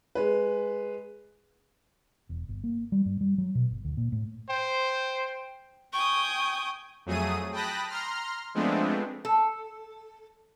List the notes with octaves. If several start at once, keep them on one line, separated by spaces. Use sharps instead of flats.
G#3 B4
E1
G1
A#3
G3
G2
G3
F#3
B2
G1
D2
A#2
A2
C5 G5
G5 G#5 C#6 D#6
F2 F#3 A3 G#4 D#6 D#7
G5 A5 B5 D#6 F#6 A#6
A#5 C6 F6
F3 G#3 A3 B3 C4 D4
A4